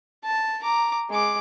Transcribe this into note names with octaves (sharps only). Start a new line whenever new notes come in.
A5
A#5 D6
G#3 D6